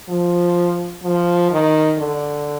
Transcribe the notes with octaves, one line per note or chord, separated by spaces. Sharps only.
F3
F3
D#3
D3